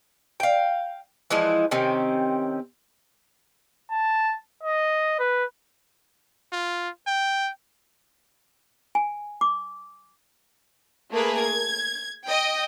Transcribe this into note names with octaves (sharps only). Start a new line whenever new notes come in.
F5 G5
E3 F3 G#3 E4
C3 D#3 C4 C#4
A5
D#5
B4
F4
G5
G#5
D6
A3 A#3 G#4 A#4 B4
G#6
D#5 G5